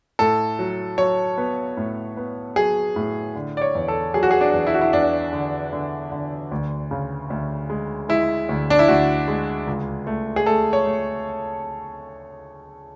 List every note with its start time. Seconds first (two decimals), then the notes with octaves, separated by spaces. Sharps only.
0.19 A2 A4
0.59 F#3
0.98 F#3 C#5
1.38 B3
1.77 A2
2.17 B3
2.56 F#3 G#4
2.96 A2
3.35 D3
3.57 D5
3.62 C#5
3.75 E2
3.88 A4
4.14 F#3 G#4
4.23 F#4
4.31 G#4
4.41 D4
4.54 E2
4.67 E4
4.74 F#4
4.81 E4
4.93 E2 D4
5.33 D3
5.73 D3
6.12 D3
6.51 D2
6.91 C#3
7.30 D2
7.70 G#3
8.09 G#3 E4
8.49 D2
8.70 D4
8.79 E4
8.88 D2 F#4
9.28 G#3
9.67 C#2
10.07 A3
10.36 G#4
10.46 A3 A4
10.73 C#5
10.86 A3